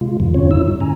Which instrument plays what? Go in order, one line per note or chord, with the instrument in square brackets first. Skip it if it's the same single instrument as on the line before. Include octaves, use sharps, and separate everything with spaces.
[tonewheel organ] C3 G#3 F4
E2 G#2 C3 D#3 F3
E2 D3 C4 C#4 F4 C#5
F#2 D#3 D#4 E4 E6
G2 G3
G#2 D3 C#4 G#5 A#5